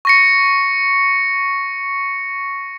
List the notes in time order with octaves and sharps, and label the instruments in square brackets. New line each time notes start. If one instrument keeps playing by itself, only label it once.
[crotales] C#6 A#6 C#7